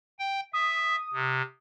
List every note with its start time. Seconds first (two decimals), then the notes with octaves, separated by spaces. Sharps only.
0.19 G5
0.53 E5 D#6
1.14 C3